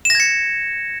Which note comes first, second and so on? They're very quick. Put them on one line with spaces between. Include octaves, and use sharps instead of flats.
E7 A#6 G#6 C#7